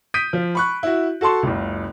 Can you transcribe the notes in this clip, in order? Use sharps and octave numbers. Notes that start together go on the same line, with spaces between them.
D#6 G6 B6 D7 D#7
F3
B5 C#6 F#6
E4 F#4
F#4 A4 A5 C6 C#6
F#1 C#2